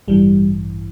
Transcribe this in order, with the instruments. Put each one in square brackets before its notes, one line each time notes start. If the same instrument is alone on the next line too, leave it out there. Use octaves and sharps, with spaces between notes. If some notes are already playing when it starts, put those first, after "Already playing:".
[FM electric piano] A1 G2 E3 G3